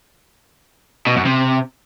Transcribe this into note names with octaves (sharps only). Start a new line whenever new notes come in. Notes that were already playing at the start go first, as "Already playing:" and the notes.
B2
F#2
C3